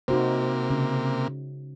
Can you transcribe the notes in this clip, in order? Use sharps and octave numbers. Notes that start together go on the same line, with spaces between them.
C3 A#3 D#4 F#4 C5
C#3